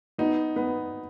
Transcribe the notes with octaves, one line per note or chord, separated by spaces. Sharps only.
B3 D#4
B3